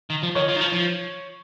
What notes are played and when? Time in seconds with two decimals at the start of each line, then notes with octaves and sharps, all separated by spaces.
0.10 D#3
0.23 F3
0.35 D#3 C#5
0.48 F3
0.56 D#3
0.61 F3
0.73 F3